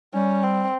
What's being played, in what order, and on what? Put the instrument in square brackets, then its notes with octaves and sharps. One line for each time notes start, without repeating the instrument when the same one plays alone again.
[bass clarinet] G3 [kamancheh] C#4
[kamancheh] C4